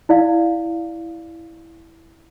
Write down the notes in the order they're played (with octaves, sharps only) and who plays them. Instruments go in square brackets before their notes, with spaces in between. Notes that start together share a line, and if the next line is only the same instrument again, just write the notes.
[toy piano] E4 D5 F5